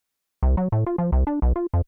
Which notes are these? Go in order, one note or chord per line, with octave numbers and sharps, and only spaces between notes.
C2
F#3
A2
F4
F3
C2
D4
B1
F4
F2